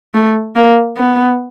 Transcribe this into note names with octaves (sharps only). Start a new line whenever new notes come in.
A3
A#3
B3